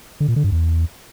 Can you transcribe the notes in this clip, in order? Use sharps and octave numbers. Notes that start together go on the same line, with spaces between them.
D3
A#2
D3
G2
E2